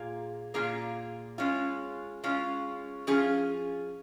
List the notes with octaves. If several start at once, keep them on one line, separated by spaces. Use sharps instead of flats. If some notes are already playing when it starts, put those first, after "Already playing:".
Already playing: A#2 A#3 F4 G#4
A#2 A#3 F4 G#4
G#3 C#4 F4
G#3 C#4 F4
F3 C#4 F4 G#4